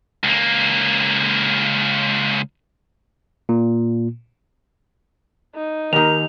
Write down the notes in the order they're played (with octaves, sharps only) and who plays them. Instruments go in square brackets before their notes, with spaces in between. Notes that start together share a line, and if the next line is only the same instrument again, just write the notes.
[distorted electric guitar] C#2 A#3
[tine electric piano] A#2
[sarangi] D#4
[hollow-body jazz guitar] D#2 D#3 [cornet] A#4 [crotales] F7